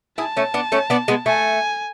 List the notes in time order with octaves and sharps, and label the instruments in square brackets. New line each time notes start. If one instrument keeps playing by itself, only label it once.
[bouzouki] E4 G#4 [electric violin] A5
[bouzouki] A3 C#4
B3 D4
A3 C#4
B3 D4
G#3 B3
[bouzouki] A3 [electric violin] G#5